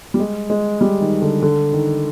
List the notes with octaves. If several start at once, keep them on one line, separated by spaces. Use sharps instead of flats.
G3
G#3
G#3
G3
D#3
D3
D3
D#3